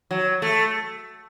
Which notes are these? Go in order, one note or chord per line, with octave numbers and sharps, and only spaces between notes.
F#3
A3